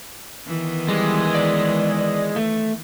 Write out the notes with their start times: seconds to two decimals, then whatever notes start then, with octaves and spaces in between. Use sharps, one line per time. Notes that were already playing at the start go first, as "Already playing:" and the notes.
0.47 D#3 E3 B3
0.88 G3 G#3
1.35 D5
2.36 A3